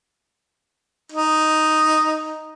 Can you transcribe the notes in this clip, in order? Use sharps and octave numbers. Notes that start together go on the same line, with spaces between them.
D#4